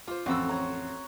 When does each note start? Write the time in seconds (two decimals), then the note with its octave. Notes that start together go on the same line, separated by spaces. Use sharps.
0.08 F4 C5 D6
0.26 A1 F2 C4 F#4 E6
0.49 C#5 A#5